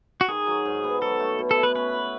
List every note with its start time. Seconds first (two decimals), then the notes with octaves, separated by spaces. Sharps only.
0.21 F#4
0.28 D#3 G#4
0.47 F#3
0.65 G#2
0.84 B3
1.01 F#3 A4
1.20 A3
1.39 B2
1.51 A4
1.57 E4
1.63 B4
1.75 C#4 B4
1.94 F#4